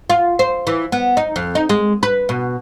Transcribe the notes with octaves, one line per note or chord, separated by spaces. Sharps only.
F4
C5
E3
B3
D#4
F2
D#4
G#3
B4
B2